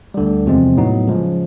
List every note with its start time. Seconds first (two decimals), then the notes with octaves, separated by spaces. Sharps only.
0.14 D2 D3 G3
0.45 E2 C3 F3 G#3 C4
0.77 A2 F#3 B3 D#4
1.08 C#3 F3 G#3